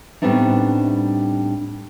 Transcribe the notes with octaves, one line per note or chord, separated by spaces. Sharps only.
A2 G3 B3 C4 D4 D#4